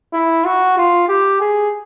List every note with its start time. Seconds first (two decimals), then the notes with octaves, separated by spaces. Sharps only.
0.13 E4
0.45 F#4
0.77 F4
1.08 G4
1.41 G#4